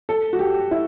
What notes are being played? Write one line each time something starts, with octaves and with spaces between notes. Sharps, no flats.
A4
F#4
G4
E4